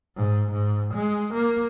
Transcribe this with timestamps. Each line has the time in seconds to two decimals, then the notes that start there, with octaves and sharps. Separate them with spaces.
0.17 G#2
0.51 G#2
0.94 G#3
1.34 A#3